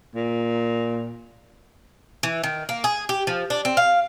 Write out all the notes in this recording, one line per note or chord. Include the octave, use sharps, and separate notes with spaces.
A#2
E3
D#3
A#3
G#4
G4
F3
D4
C4
F5